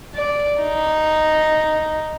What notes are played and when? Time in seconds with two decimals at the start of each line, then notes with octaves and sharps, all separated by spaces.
0.15 D5
0.62 D#4